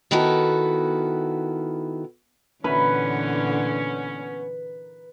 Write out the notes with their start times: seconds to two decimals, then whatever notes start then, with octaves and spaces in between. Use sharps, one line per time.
0.11 D#3 B3 E4 F#4 A4
2.64 A#2 D3 E3 B3 C#4 B4